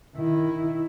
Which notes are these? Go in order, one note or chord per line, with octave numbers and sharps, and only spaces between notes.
D#3 E4